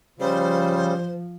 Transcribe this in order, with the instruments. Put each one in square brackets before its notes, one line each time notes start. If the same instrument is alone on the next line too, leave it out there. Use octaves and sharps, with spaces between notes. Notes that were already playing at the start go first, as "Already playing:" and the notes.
[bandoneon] C#3 G3 [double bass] F3 [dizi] C5